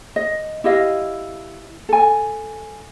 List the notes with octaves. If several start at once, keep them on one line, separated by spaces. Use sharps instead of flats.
D#5
E4 G4 D#5 F5
A4 G#5